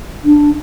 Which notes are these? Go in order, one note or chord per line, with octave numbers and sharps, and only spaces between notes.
D4